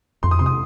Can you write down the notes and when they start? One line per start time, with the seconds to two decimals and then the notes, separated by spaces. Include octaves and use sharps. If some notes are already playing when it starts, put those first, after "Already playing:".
0.23 F2 C6
0.31 D#6
0.39 C3 C6
0.46 D#6